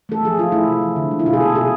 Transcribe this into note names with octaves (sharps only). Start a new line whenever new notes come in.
A3 A4
F3 G#4
F3 F4
A3 E4
C3
F3
D3
G#3
E4
B2 F4
G#4
C3 A4
C3 G#4